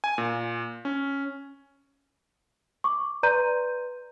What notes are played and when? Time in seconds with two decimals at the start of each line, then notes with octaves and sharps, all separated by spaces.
0.04 G#5
0.18 A#2
0.85 C#4
2.84 C#6 D6
3.23 B4 D5 A#5 C6 G6 D#7